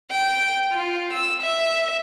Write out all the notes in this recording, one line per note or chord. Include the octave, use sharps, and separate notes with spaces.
G5
F4
E6
E5